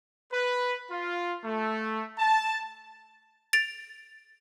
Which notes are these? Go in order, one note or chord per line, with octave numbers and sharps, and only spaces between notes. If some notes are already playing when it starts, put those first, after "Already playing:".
B4
F4
A3
A5
A6 D7 F7